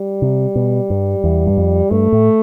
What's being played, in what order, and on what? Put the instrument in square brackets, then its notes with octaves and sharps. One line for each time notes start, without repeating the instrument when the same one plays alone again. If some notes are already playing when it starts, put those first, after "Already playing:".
Already playing: [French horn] G3
[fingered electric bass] C3
B2
G2
E2
G2
F2
[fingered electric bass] G2 [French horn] A3
[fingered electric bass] A2